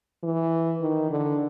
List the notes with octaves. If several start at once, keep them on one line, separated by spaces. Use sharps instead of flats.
E3
D#3
D3